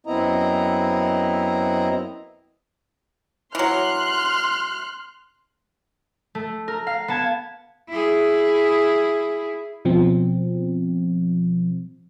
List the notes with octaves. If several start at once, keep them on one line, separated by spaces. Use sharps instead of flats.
F#2 B3 C4 E4 D#5 A#5
E3 F#3 C6 F6 F#6
A3
A#4
F5
B3 A5 G#6
E4 G#4
B2 F3 C4